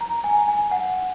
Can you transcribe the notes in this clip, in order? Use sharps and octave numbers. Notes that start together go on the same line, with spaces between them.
A#5
G#5
G#5
F#5